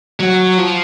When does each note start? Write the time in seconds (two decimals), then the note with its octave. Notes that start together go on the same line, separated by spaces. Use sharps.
0.20 F#3
0.58 F3